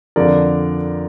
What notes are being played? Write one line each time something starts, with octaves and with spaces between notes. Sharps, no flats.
F2 D3 F3 A#4 D5